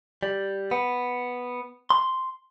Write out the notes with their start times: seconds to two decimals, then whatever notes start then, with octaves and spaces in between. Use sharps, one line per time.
0.23 G3
0.71 B3
1.90 C6